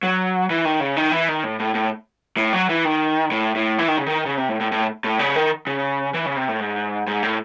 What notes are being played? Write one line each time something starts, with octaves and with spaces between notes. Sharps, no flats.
F#3
E3
D#3
C#3
D#3
E3
D#3
A2
A2
A2
A2
F#3
E3
D#3
A2
A2
E3
D#3
C#3
D#3
C#3
C3
A2
A2
A2
A2
C#3
D#3
C#3
E3
C#3
C3
A2
G#2
G#2
A2